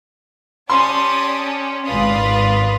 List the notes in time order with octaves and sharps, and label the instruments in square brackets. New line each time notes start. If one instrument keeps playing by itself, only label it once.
[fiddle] C#4 G4 [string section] D5 A5 D#6 [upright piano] C6
[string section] G#1 D5 D#6 [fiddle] F4 B4